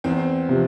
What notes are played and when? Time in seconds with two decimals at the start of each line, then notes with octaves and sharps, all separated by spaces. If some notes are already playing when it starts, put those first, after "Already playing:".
0.04 E2 C4
0.49 C3 F3